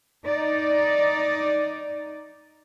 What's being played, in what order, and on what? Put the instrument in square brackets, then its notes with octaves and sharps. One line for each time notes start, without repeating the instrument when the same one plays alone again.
[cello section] D#4 D5